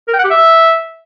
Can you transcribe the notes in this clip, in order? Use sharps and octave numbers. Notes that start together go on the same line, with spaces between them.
A#4
G5
F#5
G4
E5